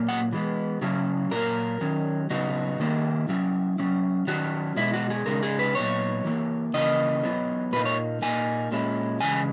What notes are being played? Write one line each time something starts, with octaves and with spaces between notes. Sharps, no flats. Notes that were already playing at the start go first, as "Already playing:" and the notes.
Already playing: A#2 F#3 A#3
F#5
E3 G#3 B3
C#3 F#3 C#4 E4
A#2 F#3 A#3 A#4
D#3 F#3 C#4
C#3 F#3 B3 D#4 F#4
D#3 A#3 E4
F#3 C#4 E4
F#3 C#4 E4
D#3 F#3 C#4 E4 F#4
B2 G#3 D#4 E4
F#4
G#4
C#3 G#3 D#4 A#4
G#4
B4
A#2 F#3 B3 D#4 C#5
E3 A#3 E4
C#3 E3 A#3 E4 D#5
F#3 B3 E4
A#2 A#3 D#4 B4
C#5
A#2 A#3 D#4 G#5
A#2 G#3 C#4 E4
C#3 E3 G#3 G#5